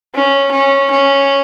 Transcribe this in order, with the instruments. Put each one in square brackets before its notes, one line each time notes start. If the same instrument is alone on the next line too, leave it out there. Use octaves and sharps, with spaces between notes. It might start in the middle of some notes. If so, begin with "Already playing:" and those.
[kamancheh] C#4
C#4
C#4